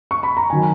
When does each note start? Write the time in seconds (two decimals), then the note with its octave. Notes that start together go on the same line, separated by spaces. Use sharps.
0.11 C#6
0.23 B5
0.37 A#5
0.50 D#3 F#3 G#5